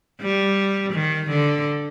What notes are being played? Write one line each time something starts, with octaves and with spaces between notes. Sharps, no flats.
G3
D#3
D3